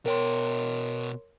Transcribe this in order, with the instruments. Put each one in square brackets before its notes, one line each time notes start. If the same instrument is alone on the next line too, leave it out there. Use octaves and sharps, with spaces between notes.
[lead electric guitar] B2 G5 [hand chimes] A#4 C#5 C6